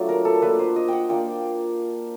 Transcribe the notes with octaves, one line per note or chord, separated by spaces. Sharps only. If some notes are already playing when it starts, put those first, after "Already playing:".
Already playing: F#3 A3 D4 F4
A#4
A4
A#3 D4 F4 B4
C5
D#5
F#5 G5
A#3 D4 F4 G5